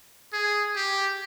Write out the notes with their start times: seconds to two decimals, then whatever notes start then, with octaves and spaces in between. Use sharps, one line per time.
0.33 G#4
0.76 G4